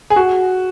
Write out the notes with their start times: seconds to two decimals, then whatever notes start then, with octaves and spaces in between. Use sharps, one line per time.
0.10 G#4
0.16 F#4